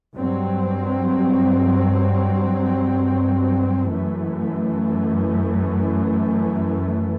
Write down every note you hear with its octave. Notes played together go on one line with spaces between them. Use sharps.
G2 F#3 C4
F#2 E3 A3